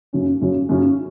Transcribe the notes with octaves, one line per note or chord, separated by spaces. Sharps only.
F#2 C#3 F#3 C#4
F#2 C#3 F#3 C#4
F#2 C#3 F#3 C#4